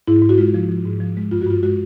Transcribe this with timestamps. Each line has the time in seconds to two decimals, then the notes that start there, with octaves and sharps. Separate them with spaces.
0.07 G#2 E4
0.22 G#2
0.29 F#4
0.38 G#3 F4
0.54 F3
0.69 F3
0.85 G#2
1.00 F3
1.17 G#3
1.31 G2 F4
1.41 F#4
1.47 G2 F4
1.63 G#3 F#4